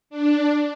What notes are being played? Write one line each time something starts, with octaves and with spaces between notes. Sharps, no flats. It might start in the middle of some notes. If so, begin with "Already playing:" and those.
D4